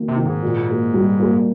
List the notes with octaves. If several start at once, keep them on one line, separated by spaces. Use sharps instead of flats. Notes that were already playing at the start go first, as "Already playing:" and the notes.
Already playing: D#3 A#3
C3
D#3
G#2
A#2
A#3
G3
A#3